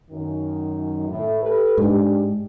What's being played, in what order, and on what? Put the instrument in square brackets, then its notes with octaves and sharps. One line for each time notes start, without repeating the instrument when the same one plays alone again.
[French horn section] F#2 D#3
A2
G4 A4 B4
[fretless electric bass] G#2 [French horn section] G#3 D4 G4